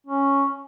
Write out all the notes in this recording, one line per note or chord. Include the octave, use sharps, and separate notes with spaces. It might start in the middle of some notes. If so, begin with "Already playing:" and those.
C#4